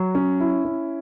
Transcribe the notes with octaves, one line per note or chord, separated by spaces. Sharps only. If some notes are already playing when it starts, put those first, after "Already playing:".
Already playing: F#3
C#4
E4
C#4